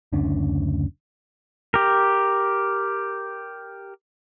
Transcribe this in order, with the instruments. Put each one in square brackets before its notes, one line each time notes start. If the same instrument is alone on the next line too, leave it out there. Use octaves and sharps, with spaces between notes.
[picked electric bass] F#1 D2 C#4 D4
[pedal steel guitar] G4 A#4